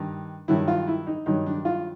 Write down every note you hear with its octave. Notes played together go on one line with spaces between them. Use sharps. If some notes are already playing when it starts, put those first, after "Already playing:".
Already playing: G2 D#3
G2 D#3 F#3 E4
F4
E4
D#4
G2 D#3 F#3 D#4
D4
F4